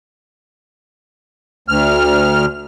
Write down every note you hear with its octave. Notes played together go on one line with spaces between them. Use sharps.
D2 F6